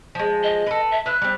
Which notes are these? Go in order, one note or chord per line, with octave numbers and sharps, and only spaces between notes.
F3 G#3
D#5
A4 B4
E5
B4 E5 F#6
G3 C4